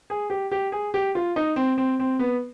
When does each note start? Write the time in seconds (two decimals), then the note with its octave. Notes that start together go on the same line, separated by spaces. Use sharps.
0.10 G#4
0.30 G4
0.52 G4
0.72 G#4
0.94 G4
1.15 F4
1.36 D#4
1.56 C4
1.78 C4
1.99 C4
2.19 B3